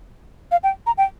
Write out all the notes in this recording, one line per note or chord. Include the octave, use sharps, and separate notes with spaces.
F5
G5
A#5
G5